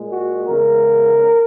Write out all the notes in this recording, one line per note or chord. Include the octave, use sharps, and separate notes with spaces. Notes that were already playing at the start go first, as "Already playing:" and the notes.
Already playing: A#2 G#3
F#4
E2 C#3 G#3 A#4